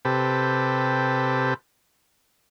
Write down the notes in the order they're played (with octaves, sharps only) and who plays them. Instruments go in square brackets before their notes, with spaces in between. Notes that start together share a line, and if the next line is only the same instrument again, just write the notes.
[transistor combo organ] C3 G4 A4 B4